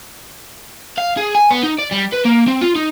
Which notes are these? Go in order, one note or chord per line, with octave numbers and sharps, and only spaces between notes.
F5
G#4
G#5
B3
D#4
D5
G3
B4
A#3
C4
F4
D#4